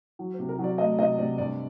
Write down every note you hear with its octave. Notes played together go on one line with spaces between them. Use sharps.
F#3
C5
C3
A#4
F#3 D5
A3 D#5
C3 D#5
C3 D5
G2 D5